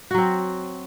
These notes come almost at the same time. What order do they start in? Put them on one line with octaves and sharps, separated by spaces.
F#4 F#3 C4